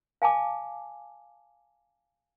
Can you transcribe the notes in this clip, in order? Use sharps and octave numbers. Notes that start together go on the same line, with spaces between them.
F5 G#5 A5 D6